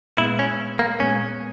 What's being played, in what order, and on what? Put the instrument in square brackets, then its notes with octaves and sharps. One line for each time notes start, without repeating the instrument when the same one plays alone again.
[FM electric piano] A#2 G#3 B3 [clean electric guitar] E4
[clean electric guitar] C#4
A#3
[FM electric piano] A#2 G#3 B3 [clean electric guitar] C#4